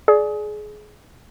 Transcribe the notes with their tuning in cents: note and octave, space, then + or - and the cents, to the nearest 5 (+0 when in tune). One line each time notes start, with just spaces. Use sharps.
G#4 +25 D5 +0